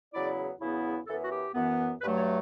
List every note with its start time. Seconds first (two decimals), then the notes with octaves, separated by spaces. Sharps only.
0.13 E2 C#3 F#3 B3 E4 D5
0.61 E2 C#3 F#3 B3 E4
1.07 F#2 E3 B3 A4
1.24 F#4
1.32 G4
1.55 F#2 E3 B3
2.02 G2 F#3 A3 B4
2.18 C#5